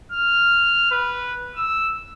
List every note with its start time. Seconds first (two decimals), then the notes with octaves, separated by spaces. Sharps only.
0.12 F6
0.91 B4
1.55 E6